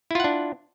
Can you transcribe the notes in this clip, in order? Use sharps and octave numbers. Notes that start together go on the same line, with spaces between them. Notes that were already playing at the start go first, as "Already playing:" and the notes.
D4 E4 F4 F#5